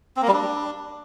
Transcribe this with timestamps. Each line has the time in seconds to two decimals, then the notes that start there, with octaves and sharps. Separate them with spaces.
0.16 C4
0.22 A#3
0.28 G3
0.33 D4